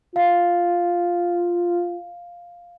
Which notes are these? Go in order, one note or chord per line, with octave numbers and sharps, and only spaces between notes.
F4 F5